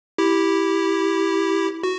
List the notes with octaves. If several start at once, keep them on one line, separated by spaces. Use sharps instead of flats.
E4 G4
F#4